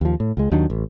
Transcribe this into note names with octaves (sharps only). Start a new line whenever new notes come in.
D#2 F3
A2
C#2 G#3
D#2 D#3 F#3 D4
A1